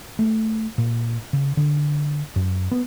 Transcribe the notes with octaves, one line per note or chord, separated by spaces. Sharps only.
A3
A#2
C#3
D3
F#2
B3